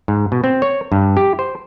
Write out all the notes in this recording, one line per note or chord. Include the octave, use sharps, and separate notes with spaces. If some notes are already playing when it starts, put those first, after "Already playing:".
G#2
B2
C4
C#5
G2
G4
C5